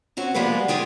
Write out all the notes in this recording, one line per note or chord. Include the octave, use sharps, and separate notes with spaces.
C4 C#4 F#4
F3 G3 G#3 A#3 B3 B4
A2 F4 G4 G#4 G5